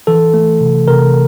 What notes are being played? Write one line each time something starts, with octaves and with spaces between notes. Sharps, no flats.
E3 A4
A3
C3
C3 A#4